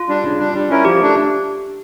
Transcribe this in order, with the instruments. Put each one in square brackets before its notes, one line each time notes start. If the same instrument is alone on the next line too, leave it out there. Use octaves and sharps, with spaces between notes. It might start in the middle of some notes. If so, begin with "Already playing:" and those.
Already playing: [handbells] F4
[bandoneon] G3 D4
C#3
G3 D4
G3
C#4 E4 A#4
[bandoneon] F3 [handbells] G4
[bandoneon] A3 D4